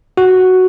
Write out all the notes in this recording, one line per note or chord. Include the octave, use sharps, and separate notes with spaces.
F#4